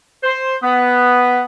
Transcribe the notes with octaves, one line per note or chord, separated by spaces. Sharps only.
C5
B3